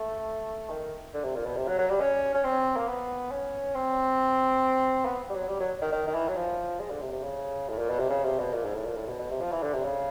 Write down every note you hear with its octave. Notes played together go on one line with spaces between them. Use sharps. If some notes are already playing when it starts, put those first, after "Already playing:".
Already playing: A3
D#3
D3
C3
A#2
B2
C3
F#3
F#3
G3
C#4
C#4
C4
A#3
B3
C#4
C4
B3
G3
F#3
G3
F#3
D#3
D#3
D#3
E3
F#3
F3
G#3
D3
C3
C3
C#3
A2
A#2
B2
C3
C#3
C3
B2
A#2
G#2
A2
A#2
A2
B2
B2
C3
F3
E3
D3
C3
C#3